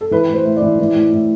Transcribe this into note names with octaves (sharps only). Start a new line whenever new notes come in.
A4
E3 B4
A2 C5
A2
D5
E3
E3
A2
A2